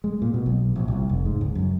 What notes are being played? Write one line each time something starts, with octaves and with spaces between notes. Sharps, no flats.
G#3
A#2
B2
B1
A#1
C2
F1
G#2
C#2
F#2